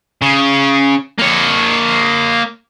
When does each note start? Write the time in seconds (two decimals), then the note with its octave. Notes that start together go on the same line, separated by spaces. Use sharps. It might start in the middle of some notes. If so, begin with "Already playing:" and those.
0.22 C#3
1.18 A#3 C#5